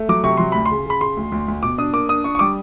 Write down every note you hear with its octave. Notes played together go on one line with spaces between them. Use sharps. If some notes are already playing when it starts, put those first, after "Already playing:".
Already playing: A3
F#3 D6
C3 C#6
F#3 C6
D2 B5
C6
C#3
C#3 B5
C#3 C6
D2
D2
D2
B2 D6
D4 D#6
A#3 D6
D4 D#6
D4 C#6
C#6
G3 D6